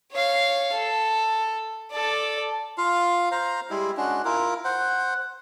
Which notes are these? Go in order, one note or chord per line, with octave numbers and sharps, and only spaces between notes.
C#5 F5
A4
A4 D5
F4 F5
C5 F5 A#5
G3 G#3 E4
G#3 C#4 D4 F#4
E4 F4 A#4
C5 F#5